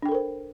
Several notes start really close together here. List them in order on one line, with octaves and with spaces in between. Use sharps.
D4 G5 A4 A#4 C5